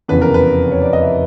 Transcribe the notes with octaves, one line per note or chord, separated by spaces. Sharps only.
F1 E2 C#3 E3 B4
A#4
B4
C#5
D5
D#5
E5